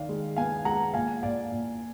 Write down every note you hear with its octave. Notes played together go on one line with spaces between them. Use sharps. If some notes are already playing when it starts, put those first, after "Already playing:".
Already playing: D#3 D5 F5
G#3
B3 F5 G#5
G#3 F#5 A#5
A#2 F5 G#5
A#2 D5 F5
A#2